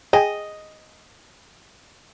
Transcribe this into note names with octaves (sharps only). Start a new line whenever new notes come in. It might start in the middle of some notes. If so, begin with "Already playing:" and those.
G#4 D#5 G5 G#5